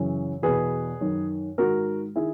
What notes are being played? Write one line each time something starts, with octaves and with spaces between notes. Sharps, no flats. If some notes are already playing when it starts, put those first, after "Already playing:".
Already playing: F#2 C#3 E3
E2 B2 G#4 B4
F#2 D#3
G#2 D#3 F#4 A#4
D#3 E4 G#4